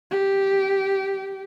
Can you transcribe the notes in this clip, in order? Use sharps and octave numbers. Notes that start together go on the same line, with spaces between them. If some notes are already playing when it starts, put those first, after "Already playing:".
G4